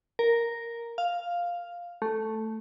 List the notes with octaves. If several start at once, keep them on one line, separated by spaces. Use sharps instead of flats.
A#4
F5
A3